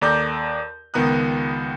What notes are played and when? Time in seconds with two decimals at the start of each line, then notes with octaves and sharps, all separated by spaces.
0.01 D#2 A4 D5 A#5 D6 G6
0.94 C#2 D#3 B3 A#5 D#6 F#6